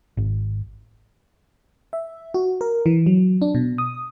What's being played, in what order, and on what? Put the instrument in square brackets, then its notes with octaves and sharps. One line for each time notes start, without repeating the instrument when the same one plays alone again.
[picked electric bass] G#1
[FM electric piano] E5
F#4
A#4
E3
F#3
D4
B2
D#6